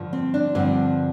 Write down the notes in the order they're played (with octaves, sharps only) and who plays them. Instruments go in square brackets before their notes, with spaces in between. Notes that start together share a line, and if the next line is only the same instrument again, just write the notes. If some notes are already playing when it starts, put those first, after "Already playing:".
Already playing: [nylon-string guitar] G2 D3 F3
C4
D4
G2 D3 F3 C4